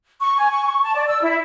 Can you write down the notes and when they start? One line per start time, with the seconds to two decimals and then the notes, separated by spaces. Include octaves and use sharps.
0.21 C#6
0.38 G#5
0.51 C#6
0.66 C#6
0.83 A5
0.94 D5
1.08 E6
1.22 E4